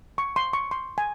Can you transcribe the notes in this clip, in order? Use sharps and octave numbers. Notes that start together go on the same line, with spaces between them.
C#6
C6
C#6
C6
G#5